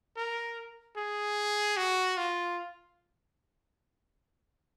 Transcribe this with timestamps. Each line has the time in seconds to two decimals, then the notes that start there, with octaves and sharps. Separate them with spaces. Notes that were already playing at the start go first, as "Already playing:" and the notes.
0.16 A#4
0.96 G#4
1.77 F#4
2.17 F4